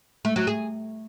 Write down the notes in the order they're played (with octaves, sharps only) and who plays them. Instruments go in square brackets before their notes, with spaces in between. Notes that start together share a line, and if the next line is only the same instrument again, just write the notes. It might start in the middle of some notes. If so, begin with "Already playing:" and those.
[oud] A3
F#3
G#4